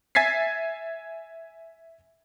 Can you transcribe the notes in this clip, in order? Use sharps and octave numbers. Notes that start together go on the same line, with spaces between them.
E5 G#5 G#6 A6 B6 C7